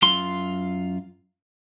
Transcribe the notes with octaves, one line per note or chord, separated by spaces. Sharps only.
F#2 F4 C6